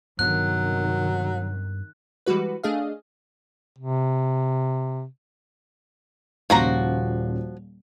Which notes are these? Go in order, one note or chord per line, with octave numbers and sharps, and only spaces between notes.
G2 C3 D#3 F#3 B3 D4 F#6
E3 G3 G#3 F#4 B4
A3 D4 G#4 D#5 F5
C3
D#1 A#2 C#3 F3 F#4 A#5